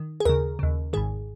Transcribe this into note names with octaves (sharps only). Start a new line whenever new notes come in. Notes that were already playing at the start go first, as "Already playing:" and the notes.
Already playing: D#3
G#4
D#2 C#3 A#4
D#2 C#3
G#1 G#2 D#3 G#4